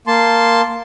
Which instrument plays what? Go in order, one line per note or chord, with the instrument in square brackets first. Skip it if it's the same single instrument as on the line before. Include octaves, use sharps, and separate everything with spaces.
[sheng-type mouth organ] A#3 A5 C6